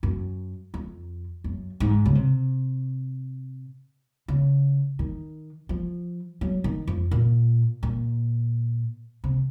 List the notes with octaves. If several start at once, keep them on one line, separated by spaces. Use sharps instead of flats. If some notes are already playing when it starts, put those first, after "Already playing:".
F#2
F2
F#2
G#2
C#3
C3
C#3
D#3
F3
F#3
D#3
F2
A#2
A#2
C3